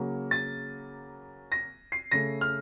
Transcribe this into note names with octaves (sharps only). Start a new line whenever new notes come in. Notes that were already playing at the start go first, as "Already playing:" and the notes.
Already playing: C#3 F#3 A#3
A6
A#6
C7
C#3 A3 A#6
F6